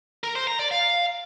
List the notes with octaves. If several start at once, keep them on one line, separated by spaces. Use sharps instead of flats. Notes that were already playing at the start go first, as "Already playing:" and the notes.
A#4
C5
A#5
D5
F5